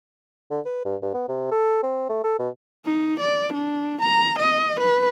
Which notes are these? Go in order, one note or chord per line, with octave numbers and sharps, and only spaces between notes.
D3
B4
G2
G2
B3
C3
A4
C4
A3
A4
B2
D#4
D5
D4
A#5
D#5
B4